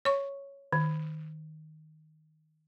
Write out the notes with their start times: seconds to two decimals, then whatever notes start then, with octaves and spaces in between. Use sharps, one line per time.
0.05 C#5 C#6
0.72 D#3